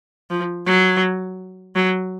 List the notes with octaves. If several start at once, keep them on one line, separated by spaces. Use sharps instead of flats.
F3
F#3
F#3